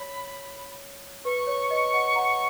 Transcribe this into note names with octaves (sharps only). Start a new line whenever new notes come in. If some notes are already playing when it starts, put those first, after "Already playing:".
Already playing: C#5 B5
B4 C#6
C#5
B4 D#5
D#5 F#5
F#5 A#5